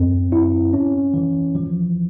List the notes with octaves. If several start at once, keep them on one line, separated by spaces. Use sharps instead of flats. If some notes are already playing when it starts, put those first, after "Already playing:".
Already playing: F#2 C4
E4
C#4
E3
F3